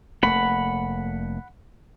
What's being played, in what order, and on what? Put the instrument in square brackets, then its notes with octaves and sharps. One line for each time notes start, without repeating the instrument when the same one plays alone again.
[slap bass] F1 A3 A#3 [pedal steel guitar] F#5 B5